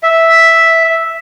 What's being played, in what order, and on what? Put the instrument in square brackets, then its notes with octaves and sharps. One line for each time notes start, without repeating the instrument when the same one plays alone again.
[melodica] E5